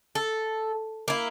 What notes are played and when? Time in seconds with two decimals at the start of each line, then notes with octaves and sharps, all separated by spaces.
0.15 A4
1.08 A#3 E4